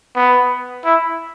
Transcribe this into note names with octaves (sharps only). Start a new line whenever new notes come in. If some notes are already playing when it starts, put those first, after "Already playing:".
B3
E4